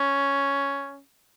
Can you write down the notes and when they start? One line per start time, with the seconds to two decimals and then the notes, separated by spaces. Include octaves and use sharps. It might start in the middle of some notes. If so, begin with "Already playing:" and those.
Already playing: C#4